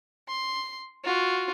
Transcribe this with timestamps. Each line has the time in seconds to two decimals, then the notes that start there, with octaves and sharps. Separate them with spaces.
0.28 C6
1.04 F4 F#4